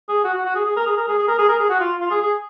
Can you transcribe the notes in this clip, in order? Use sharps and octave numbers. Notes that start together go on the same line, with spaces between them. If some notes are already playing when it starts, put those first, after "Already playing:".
G#4
F#4
F#4
F#4
G#4
G#4
A#4
G#4
A#4
G#4
G#4
A#4
G#4
A#4
G#4
F#4
F4
F4
G#4
G#4